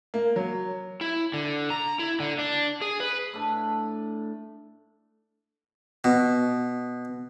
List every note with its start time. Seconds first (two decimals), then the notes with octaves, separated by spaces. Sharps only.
0.14 A#3
0.36 F#3
1.01 E4
1.33 D3
1.70 A#5
1.99 E4
2.20 D3
2.39 D4
2.81 G#4
3.00 B4
3.33 A2 D4
6.04 B2